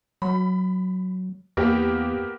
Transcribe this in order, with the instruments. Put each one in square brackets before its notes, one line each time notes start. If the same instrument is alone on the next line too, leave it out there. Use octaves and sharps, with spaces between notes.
[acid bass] F#3 [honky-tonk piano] B5
[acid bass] E2 [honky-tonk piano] A#3 B3 G4